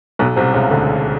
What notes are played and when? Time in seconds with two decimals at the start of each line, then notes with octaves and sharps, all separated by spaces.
0.19 B1 B2
0.36 C2 C3
0.54 C#2 C#3
0.71 D2 D3